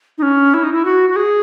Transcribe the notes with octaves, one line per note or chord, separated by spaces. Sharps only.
D#4
C#4
E4
D#4
E4
F#4
F#4
G#4